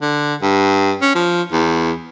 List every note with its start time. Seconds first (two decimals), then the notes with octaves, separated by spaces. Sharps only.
0.02 D3
0.42 G2
1.02 C#4
1.15 F3
1.52 E2